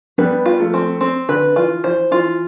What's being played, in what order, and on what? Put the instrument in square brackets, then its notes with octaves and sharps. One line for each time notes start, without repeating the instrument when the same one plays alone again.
[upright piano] G3 B3 [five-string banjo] B4
[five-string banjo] F4
[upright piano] F3 A3
[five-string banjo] C4
C4
[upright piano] D3 [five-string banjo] B4
[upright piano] E3 [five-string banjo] F4
[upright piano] E3 [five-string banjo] C5
[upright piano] E3 [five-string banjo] F4